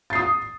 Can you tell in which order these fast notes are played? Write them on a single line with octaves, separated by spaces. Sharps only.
A6 C7 D#6